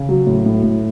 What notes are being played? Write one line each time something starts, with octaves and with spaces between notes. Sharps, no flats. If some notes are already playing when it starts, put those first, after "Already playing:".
Already playing: C#3
F#3
A2
A2
A2